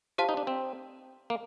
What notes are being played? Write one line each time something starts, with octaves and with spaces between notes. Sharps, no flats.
F4 G4 C5 F5 A5
D#4
D4
C4
A#3